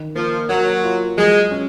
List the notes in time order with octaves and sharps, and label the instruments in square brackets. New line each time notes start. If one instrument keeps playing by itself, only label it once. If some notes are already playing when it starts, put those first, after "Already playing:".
Already playing: [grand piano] D#3
[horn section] F3 [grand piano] A#3
[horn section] F#3 [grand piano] A#3
[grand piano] F4
[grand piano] F#3 [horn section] G#3
[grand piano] C#4